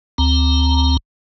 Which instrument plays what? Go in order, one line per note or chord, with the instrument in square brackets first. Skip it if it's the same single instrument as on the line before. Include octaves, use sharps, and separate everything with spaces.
[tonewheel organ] D2 C4 A#5